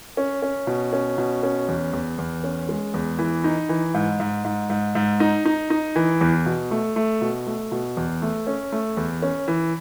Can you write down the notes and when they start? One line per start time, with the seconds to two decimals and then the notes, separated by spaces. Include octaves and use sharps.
0.17 C#4
0.42 C#4
0.67 B2
0.93 C#4
1.18 B2
1.43 C#4
1.68 E2
1.93 E2
2.18 E2
2.44 C#4
2.69 G#3
2.94 E2
3.19 E3
3.44 D#4
3.69 E3
3.94 G#2
4.20 G#2
4.45 G#2
4.70 G#2
4.95 G#2
5.20 D#4
5.45 D#4
5.70 D#4
5.96 E3
6.21 E2
6.46 B2
6.71 A3
6.96 A3
7.21 B2
7.46 A3
7.72 B2
7.97 E2
8.22 A3
8.47 C#4
8.72 A3
8.97 E2
9.22 C#4
9.48 E3